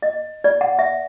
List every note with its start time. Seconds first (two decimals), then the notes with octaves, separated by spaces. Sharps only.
0.02 D#5
0.44 D5
0.61 F#5
0.79 E5